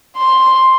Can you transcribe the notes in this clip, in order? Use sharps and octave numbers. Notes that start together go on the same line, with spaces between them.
C6